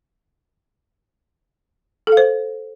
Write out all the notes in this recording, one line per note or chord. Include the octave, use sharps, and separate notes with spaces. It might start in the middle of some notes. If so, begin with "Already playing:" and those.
A4
F5
C5